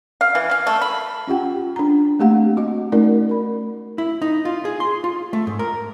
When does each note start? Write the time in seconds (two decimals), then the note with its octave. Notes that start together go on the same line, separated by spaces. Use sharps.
0.21 F5
0.35 E3
0.51 F5
0.67 A3
0.81 B5
1.27 C#4 F4 G4 F#5 G5
1.76 D4 A#5
2.19 A3 A#3 C4 G4 F5 F#5
2.57 F#4 D#5
2.92 A3 C#4 D#4 F#4 A#4 D5
3.29 A#4 B5
3.98 E4
4.22 D#4
4.45 F4
4.65 G#4
4.80 C6
5.04 F4
5.33 A3
5.47 G#2
5.59 A#4